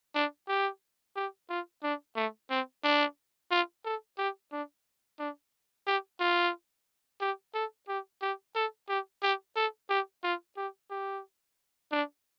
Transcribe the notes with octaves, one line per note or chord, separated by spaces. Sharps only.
D4
G4
G4
F4
D4
A3
C4
D4
F4
A4
G4
D4
D4
G4
F4
G4
A4
G4
G4
A4
G4
G4
A4
G4
F4
G4
G4
D4